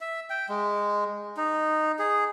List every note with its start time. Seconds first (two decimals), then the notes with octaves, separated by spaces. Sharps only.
0.01 E5
0.30 G5
0.49 G#3
1.37 D#4
1.99 G#4